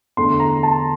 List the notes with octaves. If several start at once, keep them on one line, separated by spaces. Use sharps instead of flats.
E2 D3 A3 C6
A#5
A5